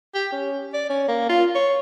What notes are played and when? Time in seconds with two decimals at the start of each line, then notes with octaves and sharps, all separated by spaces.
0.15 G4
0.32 C#4
0.73 D5
0.90 C#4
1.08 A#3
1.29 F4
1.55 C#5